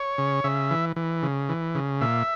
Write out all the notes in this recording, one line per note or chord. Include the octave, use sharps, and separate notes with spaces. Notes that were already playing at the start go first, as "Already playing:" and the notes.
Already playing: C#5
C#3
C#3 E5
E3
E3
C#3
E3
C#3
A#2 E5